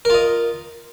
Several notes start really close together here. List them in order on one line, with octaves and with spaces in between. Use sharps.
A#4 F4 D#5